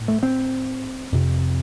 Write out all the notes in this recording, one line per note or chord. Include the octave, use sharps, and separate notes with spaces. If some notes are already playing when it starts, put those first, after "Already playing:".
Already playing: A2
A3
C4
F2 C3